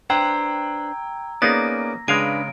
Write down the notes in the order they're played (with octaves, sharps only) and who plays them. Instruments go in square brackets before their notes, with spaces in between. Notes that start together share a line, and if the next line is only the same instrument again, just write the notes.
[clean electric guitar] D4 B4 C5 [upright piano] G5 [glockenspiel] A#5 E6 G#6
[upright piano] A#3 C#4 [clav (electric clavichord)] B3 D#4 G#4 [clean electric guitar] D5 [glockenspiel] A#6
[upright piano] C#3 [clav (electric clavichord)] G#3 F5 G#5 [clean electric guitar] D4 B4 [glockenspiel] D7